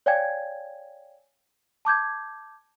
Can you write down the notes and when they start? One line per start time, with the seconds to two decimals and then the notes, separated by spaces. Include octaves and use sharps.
0.06 C#5 D5 F5 G5 G#5 G#6
1.85 A5 D6 G6 G#6